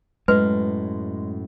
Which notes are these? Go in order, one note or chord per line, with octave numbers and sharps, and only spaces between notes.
F#2 A2 G#3 B4